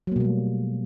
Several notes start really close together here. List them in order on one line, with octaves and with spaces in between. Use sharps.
F#3 A#3 B2 G3 A3